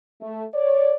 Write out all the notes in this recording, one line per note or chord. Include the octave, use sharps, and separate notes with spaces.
A3
C#5 D5